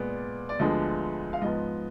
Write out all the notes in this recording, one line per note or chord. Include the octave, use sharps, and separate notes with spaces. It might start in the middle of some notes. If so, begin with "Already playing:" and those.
Already playing: A#2 G#3 B3 D5
D5
D2 D3 F3 G#3 B3 D#5
F5
G#2 F3 B3 D#5